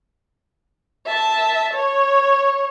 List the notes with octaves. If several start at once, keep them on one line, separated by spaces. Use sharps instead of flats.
E5 A5
C#5